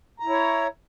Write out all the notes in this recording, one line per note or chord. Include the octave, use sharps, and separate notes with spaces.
E4 C#5 A#5